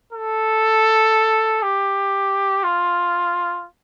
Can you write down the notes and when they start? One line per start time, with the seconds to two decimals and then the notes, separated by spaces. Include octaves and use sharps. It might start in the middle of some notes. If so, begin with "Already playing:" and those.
0.12 A4
1.62 G4
2.63 F4